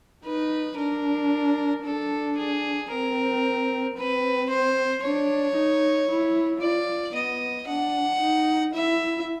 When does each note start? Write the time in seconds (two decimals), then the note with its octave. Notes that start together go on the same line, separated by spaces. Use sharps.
0.25 D#4 B4
0.78 D4 A#4
1.84 D4 A4
2.38 G#4
2.91 C4 A#4
3.96 C4 B4
4.50 C5
5.02 D4 C#5
5.56 D#4
6.09 E4
6.61 F4 D5
7.15 B3 D#5
7.67 D4 F#5
8.21 D#4
8.74 E4 E5